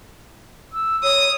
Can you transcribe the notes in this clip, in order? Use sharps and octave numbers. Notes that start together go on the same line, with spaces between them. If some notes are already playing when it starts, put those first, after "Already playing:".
E6
C#5 D#6